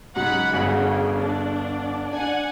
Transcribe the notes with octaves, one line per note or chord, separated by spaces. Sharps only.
G#2 C#3 F#3 F#5 B5
G1 C#3 F#4
D4
D4 F#5 G#5